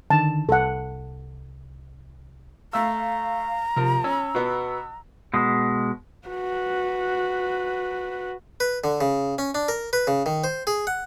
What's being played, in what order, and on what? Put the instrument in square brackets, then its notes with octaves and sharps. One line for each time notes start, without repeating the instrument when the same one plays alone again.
[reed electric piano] D3 D#3 [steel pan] A5
[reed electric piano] C2 [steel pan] A4 F#5
[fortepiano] A3 E6 [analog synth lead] F5 [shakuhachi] A#5
[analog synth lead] C3 [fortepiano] F3 A#4
[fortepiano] C#4 [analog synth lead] E6
[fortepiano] B2 B3
[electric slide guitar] B2 G#3
[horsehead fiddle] F#4 B4
[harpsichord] B4
D3
C#3
C#4
D4
A#4
B4
C#3
D#3
C5
G#4
F#5